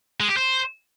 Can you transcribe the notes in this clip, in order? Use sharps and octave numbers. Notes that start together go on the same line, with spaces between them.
G#3
G4
C5